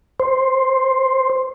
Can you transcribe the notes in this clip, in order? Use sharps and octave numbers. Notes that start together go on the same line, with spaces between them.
C5